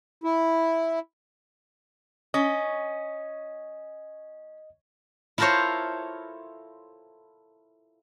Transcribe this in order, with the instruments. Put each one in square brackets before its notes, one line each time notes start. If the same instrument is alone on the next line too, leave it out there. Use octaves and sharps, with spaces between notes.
[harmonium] E4
[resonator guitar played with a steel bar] C#4 [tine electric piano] D#5
[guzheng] E4 F4 A4 A#4 C5 C#5